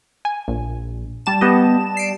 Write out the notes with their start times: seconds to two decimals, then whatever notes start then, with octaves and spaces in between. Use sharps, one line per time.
0.25 G#5
0.48 A#1
1.26 G3 A5 E7
1.41 B3 G4 D#5
1.97 C7 D7